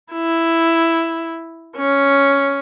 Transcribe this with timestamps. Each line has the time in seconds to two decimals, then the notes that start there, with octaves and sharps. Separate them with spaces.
0.13 E4
1.76 C#4